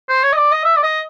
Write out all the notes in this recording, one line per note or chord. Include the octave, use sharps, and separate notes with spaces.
C5
C#5
D#5
D5
D#5
E5
D5
D#5